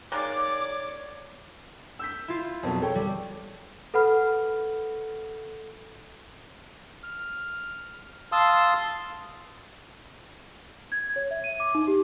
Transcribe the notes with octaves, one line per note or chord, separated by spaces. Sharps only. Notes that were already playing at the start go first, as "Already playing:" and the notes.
D#3 G#3 A#3 C#5 D5 D6
E6 G6 B6
E4 F4
F2 B2 F#3
A4 C#5 G5
G3
A4 B4 F#5 B5 F6
F6
F5 A5 C6 D#6 E6
G#6
C#5
E5
D#7
D6
D#4
G4